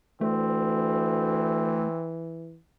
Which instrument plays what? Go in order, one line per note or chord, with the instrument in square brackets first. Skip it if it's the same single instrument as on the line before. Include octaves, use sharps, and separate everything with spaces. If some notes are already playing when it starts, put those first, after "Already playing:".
[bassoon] D2 [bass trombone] E3 [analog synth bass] A3 [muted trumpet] C4